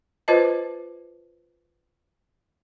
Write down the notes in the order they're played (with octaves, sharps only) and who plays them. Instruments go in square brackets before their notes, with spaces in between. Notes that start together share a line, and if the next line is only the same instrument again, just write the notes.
[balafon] F4 B4 C5 D#5 A5